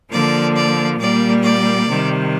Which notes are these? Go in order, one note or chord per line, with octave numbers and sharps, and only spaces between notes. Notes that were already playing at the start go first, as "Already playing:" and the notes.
D3 F3 A#3 D5
D5
A#2 G3 A#3 D5
D5
C3 D#3 G3